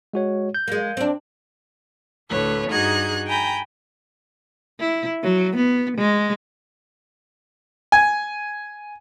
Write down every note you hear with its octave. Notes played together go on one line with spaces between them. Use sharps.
G#3 F#4 C#5
G6
G#3 A#3
C4 D4
D2 A2 A3 B4 C#5
G2 D#4 F#4 G#4 F#6 G#6
G5 G#5 A#5 B5 G6
E4
F#3
B3
G#3
G#5